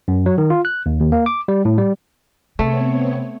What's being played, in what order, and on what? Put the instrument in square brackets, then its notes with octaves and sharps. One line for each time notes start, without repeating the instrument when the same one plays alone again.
[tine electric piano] F#2
F#3
D#3
F4
F#6
D#2
D#2
A#3
D6
G3
A2
G3
[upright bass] C3 [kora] A3 [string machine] B3 C4 C#5